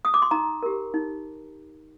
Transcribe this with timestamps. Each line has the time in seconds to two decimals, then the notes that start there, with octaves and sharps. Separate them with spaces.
0.05 D#6
0.14 D6
0.22 C6
0.31 D#4 A#5
0.63 G4 A#4
0.94 D#4